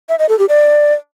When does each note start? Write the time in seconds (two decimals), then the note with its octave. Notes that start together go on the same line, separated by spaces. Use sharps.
0.09 E5
0.19 D#5
0.29 A4
0.39 G4
0.49 D5